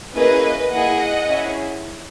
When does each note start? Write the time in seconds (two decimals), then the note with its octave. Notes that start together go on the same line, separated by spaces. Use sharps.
0.14 A#3 C#4 E4 G#4 B4 D#5
0.71 A#3 E4 G#4 D#5 F#5
1.28 C#4 E4 G#4